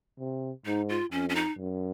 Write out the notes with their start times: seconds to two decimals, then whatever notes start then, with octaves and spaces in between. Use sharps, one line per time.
0.19 C3
0.65 G#2 D#4
0.89 F4
1.12 F2 C#4
1.29 C#4
1.35 D#4
1.58 F#2